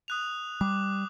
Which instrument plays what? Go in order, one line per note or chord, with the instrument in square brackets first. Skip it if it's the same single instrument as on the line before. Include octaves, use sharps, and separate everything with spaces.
[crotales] D#6 F#6 F7
[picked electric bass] G3 [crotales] D6